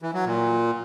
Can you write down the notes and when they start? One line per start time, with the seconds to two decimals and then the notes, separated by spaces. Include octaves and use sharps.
0.02 E3
0.14 F#3
0.25 A#2